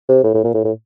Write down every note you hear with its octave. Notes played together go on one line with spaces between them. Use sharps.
C3
A2
A2
A#2
A2
A2